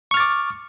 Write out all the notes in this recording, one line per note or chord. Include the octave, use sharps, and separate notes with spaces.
C#6 D6 F6 A6